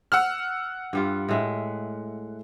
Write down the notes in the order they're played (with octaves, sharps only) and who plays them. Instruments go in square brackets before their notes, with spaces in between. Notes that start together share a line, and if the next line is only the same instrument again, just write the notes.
[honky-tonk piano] F#5 E6 F6
[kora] G2 G3 F4
A2 G#3 E5